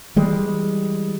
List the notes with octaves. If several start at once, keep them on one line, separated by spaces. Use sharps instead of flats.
E3 G3 G#3